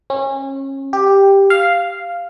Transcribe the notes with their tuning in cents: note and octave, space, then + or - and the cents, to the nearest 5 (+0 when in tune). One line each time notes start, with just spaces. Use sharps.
C#4 -30
G4 +5
F5 -5